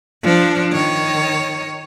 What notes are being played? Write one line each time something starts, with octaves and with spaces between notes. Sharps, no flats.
F3 D4
D#3 C#5